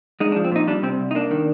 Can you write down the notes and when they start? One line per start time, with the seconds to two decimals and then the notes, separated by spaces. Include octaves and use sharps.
0.20 G#3 D#4
0.32 D4
0.36 F3
0.44 C4
0.52 A#2 D#4
0.67 G3 D4
0.83 C3 C4
1.00 C2
1.11 D#4
1.15 A#3 D4
1.31 D#3